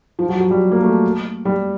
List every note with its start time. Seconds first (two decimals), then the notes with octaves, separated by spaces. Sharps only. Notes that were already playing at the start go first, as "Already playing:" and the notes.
0.19 F3
0.29 F#3
0.40 F#3
0.50 G3
0.72 A#3
0.83 A3
1.45 G3